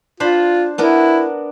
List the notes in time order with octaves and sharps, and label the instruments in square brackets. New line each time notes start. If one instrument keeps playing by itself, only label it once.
[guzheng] D4 C5 B5 [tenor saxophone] F4
[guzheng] B3 D4 A#4 [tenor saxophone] E4